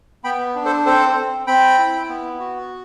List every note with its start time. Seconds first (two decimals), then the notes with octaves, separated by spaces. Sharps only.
0.24 B3 G5 B5
0.55 D4
0.65 A4 C5
0.86 C4 A4 C5
1.17 C4
1.47 C4 G5 B5
1.78 E4
2.09 B3
2.39 F#4